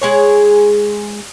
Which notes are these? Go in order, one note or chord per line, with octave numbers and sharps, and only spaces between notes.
G#3 G#4 C#5